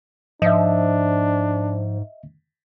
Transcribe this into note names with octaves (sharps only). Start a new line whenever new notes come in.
G#2 F3 D4 D#5 E5